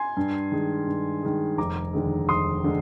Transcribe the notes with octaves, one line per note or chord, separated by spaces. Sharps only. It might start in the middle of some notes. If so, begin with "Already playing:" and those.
Already playing: G#5 C6
G2
D#3 G#3
G2
D#3 G#3
F1 A#5 D6
D#2 D3 G#3
F1 C6 D#6
D3 G#3